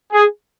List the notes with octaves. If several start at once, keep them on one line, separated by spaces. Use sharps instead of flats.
G#4